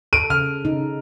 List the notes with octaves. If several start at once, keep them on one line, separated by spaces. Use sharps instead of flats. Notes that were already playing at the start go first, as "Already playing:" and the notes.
A4 D7 D#7
C#3 F6
C#3 D#4